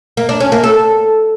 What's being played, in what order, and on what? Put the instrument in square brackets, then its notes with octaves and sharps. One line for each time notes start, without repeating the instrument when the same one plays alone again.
[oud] A#3
D4
C#4
A#3
A4